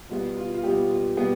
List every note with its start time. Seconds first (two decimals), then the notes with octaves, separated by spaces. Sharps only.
0.10 B2 G3 B3 F4
0.37 F4
0.54 F4
0.64 B2 G3 B3 G4
0.91 F4
1.17 B2 G3 B3 G4